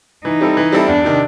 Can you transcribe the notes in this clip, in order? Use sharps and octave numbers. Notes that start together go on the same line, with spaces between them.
E3 D#4
G3 C4 E4 A4
E3
G3 C4 E4 A4
E2 D4
C3 D#3